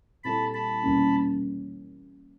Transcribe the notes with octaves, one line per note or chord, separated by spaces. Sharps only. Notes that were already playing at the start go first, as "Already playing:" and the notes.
A#2 G3 C4 E4 A4 A5 B5
A5 B5
E2 B2 G3 A#3 C#4